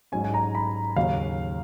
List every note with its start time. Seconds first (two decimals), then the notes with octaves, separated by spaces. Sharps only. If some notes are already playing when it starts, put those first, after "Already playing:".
0.12 G#2 F#3 C#4 G#5
0.24 G#5
0.34 A#5
0.55 B5
0.96 D#2 C#3 F#3 F5